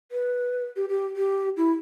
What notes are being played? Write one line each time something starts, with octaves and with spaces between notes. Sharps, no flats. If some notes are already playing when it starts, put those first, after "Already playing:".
B4
G4
G4
G4
E4